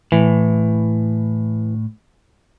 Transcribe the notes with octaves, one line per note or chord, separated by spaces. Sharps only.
A2 E3